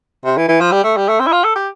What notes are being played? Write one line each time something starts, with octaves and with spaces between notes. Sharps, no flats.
C3
E3
E3
F3
G3
A3
G3
A3
C4
E4
F4
A4
G4